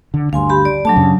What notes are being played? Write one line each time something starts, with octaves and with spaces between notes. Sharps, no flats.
D3
D2 G2 F5 G#5 C6
G4 B5
D5
F#3 A3 D4 A5
F#2 C#3